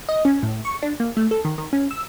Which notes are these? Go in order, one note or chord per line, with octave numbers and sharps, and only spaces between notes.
D#5
C#4
A2
C#6
D4
A#3
A3
A4
D#3
D#3
C#4
E6